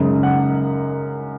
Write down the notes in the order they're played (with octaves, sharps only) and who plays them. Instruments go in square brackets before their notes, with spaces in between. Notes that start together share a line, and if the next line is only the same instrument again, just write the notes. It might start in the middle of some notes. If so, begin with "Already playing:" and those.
Already playing: [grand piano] F#2 C#3 G#3 D#4
F#5